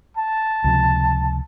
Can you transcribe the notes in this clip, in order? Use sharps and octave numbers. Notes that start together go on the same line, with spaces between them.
A5
C#2 C3 F3